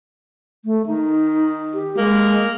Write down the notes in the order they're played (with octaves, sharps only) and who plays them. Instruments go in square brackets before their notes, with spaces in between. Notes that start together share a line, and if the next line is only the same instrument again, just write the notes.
[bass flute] A3
[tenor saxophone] D#3 [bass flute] D#4
[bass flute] G4
[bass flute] G#3 [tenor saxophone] A#3